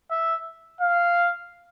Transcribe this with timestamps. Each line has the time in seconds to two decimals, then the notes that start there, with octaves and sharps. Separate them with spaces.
0.11 E5
0.81 F5